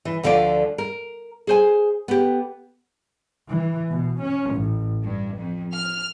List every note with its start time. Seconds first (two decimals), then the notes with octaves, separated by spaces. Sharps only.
0.05 E3
0.23 D2 D3 F3 F4 D5
0.78 A#4
1.47 G#4 C5 G#5
2.08 B3 G4
3.49 E3
3.89 B2
4.22 C#4
4.52 A1
5.03 G2
5.38 F2
5.73 F6